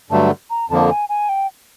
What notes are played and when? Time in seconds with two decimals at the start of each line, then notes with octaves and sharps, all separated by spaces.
0.10 G2 D3 F#3 A3 A5
0.50 A#5
0.70 F2 D3 F3 A#3 A5
0.90 G#5
1.09 G#5
1.29 G5